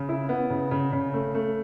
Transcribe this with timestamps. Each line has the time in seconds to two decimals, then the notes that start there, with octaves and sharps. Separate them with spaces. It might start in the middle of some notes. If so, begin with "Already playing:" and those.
Already playing: C#3
0.09 E4
0.29 B3
0.50 C#3
0.71 C#3
0.93 C#3
1.14 A3
1.35 A3